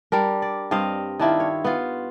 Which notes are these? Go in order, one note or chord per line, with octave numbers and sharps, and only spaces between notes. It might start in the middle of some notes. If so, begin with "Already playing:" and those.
G3 D4 A#4
D5
G2 C4 D#5 F5
D#3 D4 E4 F4
C#5
B3 F4